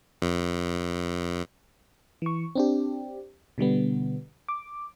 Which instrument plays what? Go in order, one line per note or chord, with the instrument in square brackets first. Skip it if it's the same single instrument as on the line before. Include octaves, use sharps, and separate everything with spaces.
[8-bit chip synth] F2
[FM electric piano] E3 C#6
C4 D4 G4
B2 D3 G3 B3
D6